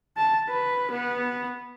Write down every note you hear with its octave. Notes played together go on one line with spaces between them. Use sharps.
A5
B4
B3